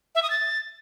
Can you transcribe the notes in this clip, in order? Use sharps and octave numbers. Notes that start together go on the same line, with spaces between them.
E5
D#6
A6